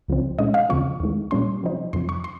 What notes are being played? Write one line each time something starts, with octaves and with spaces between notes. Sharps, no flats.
C#2 C#3 F3 C4
A#2 G#3 C#4 D#5
F5
D#2 C#3 F3 C4 C#6
D#2 D#3 G#3
A#2 G3 C#4 C6
C3 F3 C4 D#4
F2 C3 F3 C6
C#6
C6